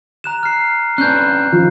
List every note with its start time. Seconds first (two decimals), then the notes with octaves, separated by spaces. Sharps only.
0.24 A#5 F#6 E7
0.43 F6 C7
0.98 C#4 D4 B4 F#6 G6
1.53 D#3 F3